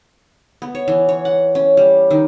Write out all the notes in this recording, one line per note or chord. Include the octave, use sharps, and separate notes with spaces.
B3
C#5
E3
C#5
F#5
C#4
G3
D#3